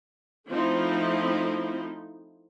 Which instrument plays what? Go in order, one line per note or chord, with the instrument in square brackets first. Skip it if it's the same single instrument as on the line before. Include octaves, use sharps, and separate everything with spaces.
[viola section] F3 A3 C4 D#4 E4